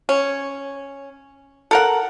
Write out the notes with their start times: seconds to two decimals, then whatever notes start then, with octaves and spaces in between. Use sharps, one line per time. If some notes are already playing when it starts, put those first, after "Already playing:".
0.09 C#4
1.71 A4 A#4 F#5